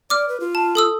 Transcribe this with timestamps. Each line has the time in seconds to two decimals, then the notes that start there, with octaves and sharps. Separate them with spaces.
0.10 D5 D6 F6
0.29 B4
0.40 F4
0.55 A5
0.75 A4 D#6 E6